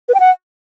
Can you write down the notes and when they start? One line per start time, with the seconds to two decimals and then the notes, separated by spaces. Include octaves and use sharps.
0.09 B4
0.14 G5
0.20 F#5